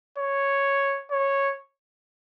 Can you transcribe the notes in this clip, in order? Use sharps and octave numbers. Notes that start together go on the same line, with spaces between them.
C#5
C#5